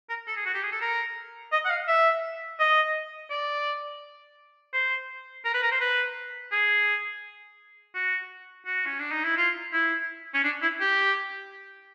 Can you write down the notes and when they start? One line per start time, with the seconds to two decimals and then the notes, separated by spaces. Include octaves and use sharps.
0.09 A#4
0.27 A4
0.36 G#4
0.45 F#4
0.54 G4
0.63 G#4
0.72 A4
0.81 A#4
1.52 D#5
1.65 F#5
1.70 F5
1.88 E5
2.59 D#5
3.30 D5
4.73 C5
5.45 A#4
5.54 B4
5.63 A#4
5.72 C5
5.80 B4
6.52 G#4
7.94 F#4
8.66 F#4
8.86 C#4
8.99 D4
9.11 D#4
9.24 E4
9.37 F4
9.73 E4
10.34 C#4
10.44 D4
10.62 E4
10.80 G4